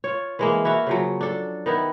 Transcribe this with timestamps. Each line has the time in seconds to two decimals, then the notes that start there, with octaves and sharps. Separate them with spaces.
0.04 F4 C#5
0.39 E3 G#3 A#3
0.65 E4 F#4 E5 F5
0.87 C#3 F3 F#3
1.21 D4 A4
1.66 D#3 B3 E4